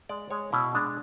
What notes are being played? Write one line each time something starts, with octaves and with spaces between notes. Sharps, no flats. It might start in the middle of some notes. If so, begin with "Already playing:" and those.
G#3 D5
G#3 C#5
B2 E4
G#3 D4